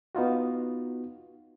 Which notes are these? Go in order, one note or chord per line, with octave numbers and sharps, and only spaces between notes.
B3 D#4 F4 F#4